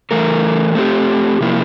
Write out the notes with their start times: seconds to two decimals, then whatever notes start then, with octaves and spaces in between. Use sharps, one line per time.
0.11 E3 A3 E4 A#4
0.75 A3 C4 G4
1.41 C3 F3 A#3 E4